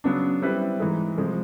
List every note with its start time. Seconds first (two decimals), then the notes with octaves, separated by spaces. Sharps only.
0.04 C#3 F#3 B3 D4
0.42 G3 C4 E4 G4 B4
0.80 G#2 E3 G#3
1.18 C3 F3 G#3